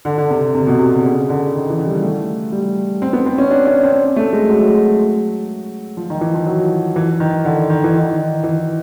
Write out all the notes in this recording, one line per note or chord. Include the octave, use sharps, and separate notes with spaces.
D3
D3
C3
C3
B2
C3
C3
C#3
D3
D#3
E3
G3
A3
G3
C4
B3
C4
C#4
D4
C#4
C4
A3
G#3
F#3
F3
D#3
E3
F3
F#3
E3
D#3
D3
D#3
E3
D#3
E3